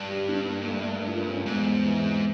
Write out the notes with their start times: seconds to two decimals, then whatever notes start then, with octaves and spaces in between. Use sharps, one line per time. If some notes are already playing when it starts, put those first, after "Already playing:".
Already playing: G2 G3
0.09 G4
0.28 D4
0.48 A#3
0.68 A3
0.88 A#4
1.07 F4
1.27 C#4
1.46 E2 G#2
1.66 E2
1.86 E3
2.05 C3